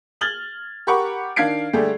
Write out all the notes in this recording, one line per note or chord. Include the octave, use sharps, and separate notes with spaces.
F6 G#6 A6 F#7 G7
G4 A#4 F#5 B5 C#6 D6
D#3 D4 F5 G#6 C7 D7
D3 G3 A3 G4 G#4